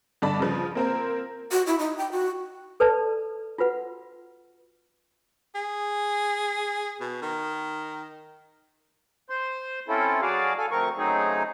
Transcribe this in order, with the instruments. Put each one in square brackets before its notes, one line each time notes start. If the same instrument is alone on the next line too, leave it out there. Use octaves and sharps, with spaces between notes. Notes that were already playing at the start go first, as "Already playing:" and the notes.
[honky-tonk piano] G2 D3 D5 D#5 A5 B5
C#3 F3
A#3 C4 A#4
[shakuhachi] F#4
E4
D#4
G5
F#4
[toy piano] A4 B4 D5 A5
F4 F#4 B4 F#5
[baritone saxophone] G#4
B2
D#3
[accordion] C5 C6
C4 C#4 E4 F4 A4
F#3 F#4 G#4 D5 F5
A4 F5 G#5
D2 F3 C4 A#4 C#6
C#3 F#3 A3 C4 D#4 G#4